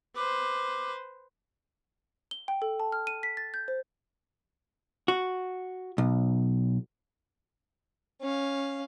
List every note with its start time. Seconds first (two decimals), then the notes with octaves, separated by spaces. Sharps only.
0.16 B4 C5 D6
2.31 G7
2.48 G5
2.62 A4
2.80 A5
2.92 F6
3.07 D#7
3.23 B6
3.37 A6
3.54 G6
3.68 C5
5.08 F#4
5.98 B1
8.21 C#4 F5